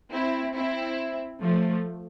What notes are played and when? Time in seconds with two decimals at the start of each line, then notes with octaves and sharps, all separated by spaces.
0.11 C4 E4
0.55 C4 E4
1.41 F3 A3